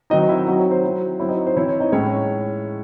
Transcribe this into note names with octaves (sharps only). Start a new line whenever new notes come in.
D#3 F#3 C4 D#4 D#5
E4 E5
F#3 C4 D#4 F#4 F#5
C#5
C5
F#3 C4 E4
F#3 C4 E4 C#5
D#4 D#5
C#5
C5
E3 C4 E4 C#5
C#5
D#4 D#5
A2 G#3 C#4 E4 C#5